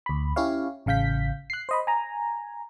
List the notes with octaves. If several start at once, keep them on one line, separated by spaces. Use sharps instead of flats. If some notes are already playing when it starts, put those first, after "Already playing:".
D2 B5
C#4 E4 G4 C#5 F5
A1 C#3 F5 G6 B6
F#6 C7
C5 D#5 B5
G#5 A#5